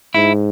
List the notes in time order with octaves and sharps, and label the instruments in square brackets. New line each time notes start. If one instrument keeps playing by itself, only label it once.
[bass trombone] G#2 [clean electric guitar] E4